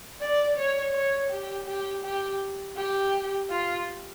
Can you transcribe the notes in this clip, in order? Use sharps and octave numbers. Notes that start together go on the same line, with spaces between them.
D5
C#5
C#5
G4
G4
G4
G4
F4